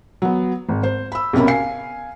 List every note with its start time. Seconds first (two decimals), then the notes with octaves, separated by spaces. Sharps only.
0.22 F#3 B3
0.68 G#1
0.83 C5
1.12 B5 E6
1.33 B1 C3 C#4 A#4 B5
1.47 F5 G#5 C7